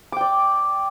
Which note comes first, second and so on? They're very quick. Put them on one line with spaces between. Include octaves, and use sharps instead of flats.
D6 G5 D5